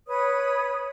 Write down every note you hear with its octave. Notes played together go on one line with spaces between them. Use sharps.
B4 C#5 D#6